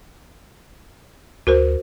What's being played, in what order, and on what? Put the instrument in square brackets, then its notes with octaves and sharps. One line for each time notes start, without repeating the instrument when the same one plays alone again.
[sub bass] D2 [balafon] F#4 A#4 C5